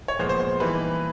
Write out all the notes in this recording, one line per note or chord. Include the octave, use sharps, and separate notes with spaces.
C#5
A#2 F3 G#3 B3 C5
C5
C5
E3 G3 A#3 D#4 B4